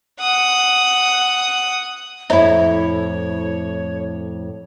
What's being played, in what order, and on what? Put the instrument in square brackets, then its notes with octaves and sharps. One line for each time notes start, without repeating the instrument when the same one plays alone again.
[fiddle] F#5 D#6
[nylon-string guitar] F2 A2 [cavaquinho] D#4 E4 [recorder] C#5